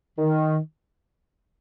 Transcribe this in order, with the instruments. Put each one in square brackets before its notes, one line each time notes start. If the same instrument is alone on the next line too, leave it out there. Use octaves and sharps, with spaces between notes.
[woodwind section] D#3